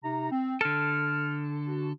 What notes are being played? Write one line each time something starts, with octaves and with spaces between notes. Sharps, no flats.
C3 D#4 A#5
C4
D3 A4 F6
F#4